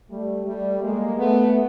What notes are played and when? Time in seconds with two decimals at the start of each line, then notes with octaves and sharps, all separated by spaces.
0.10 G3 A3
0.46 G3 A3
0.81 G#3 A#3
1.17 A3 B3